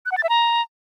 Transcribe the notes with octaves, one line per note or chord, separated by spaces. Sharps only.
F#6
F#5
A6
E5
A#5